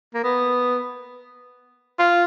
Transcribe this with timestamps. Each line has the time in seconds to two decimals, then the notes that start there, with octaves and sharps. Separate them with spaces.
0.14 A#3
0.24 B3
1.99 F4